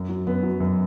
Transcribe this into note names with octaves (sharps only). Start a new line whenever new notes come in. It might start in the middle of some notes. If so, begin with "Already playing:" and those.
Already playing: F#2
F#3
F#2 B3
F#3
F#2